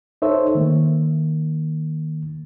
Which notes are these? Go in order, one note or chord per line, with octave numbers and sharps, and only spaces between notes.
D#4 A4 C5 C#5 E5
D#3 A#3